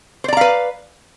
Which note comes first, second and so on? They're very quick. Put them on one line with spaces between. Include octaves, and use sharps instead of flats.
C5 D5 A#5 F5 B4